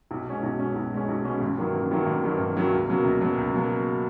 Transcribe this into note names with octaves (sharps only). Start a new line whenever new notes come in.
B1
B2 G#3 C#4
B1
B2 G#3 C#4
B1
B2 G#3 C#4
B1
B2 G#3 C#4
A1
G2 D#3 F#3 A#3
A1
G2 D#3 F#3 A#3
A1
G2 D#3 F#3 A#3
A1
G2 D#3 F#3 A#3
C#2
B2 F#3 A#3
C#2
B2 F#3 A#3
C#2
B2 F#3 A#3